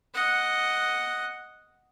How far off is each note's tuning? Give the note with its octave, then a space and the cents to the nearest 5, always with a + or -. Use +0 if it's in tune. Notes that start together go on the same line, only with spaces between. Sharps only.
D#5 +0 F#5 +0